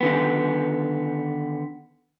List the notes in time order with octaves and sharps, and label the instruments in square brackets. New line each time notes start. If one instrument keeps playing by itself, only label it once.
[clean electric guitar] D3 D#3 B3